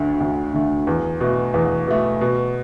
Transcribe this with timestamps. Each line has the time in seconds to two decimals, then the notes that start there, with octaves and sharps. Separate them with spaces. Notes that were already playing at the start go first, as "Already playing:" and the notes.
Already playing: D2 D3 A3
0.20 D2
0.54 D3 A3
0.87 E2
1.20 B2 A3
1.54 E2
1.87 B2 A3
2.21 B2